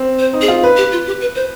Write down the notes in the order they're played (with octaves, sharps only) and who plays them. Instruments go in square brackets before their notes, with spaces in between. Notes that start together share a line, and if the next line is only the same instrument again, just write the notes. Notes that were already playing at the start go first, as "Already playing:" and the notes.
Already playing: [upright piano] C4
[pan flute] C5
[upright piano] D#4
[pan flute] G#4
[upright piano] F4
B4
[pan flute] G4
F4
G4
B4
C5